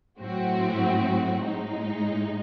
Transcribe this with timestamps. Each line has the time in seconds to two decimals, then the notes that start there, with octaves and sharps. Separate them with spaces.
0.18 A2 F#3 C4 F#4
1.41 A2 G#3 D#4